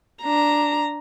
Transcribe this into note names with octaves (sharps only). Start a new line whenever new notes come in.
D4 A#5